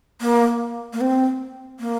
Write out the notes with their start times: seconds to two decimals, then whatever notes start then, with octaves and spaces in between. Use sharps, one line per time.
0.21 A#3
0.93 A#3
1.01 C4
1.80 A#3